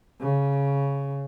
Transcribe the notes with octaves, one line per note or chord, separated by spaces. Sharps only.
C#3